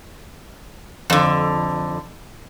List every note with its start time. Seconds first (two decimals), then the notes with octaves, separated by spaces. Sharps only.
1.10 F2 D3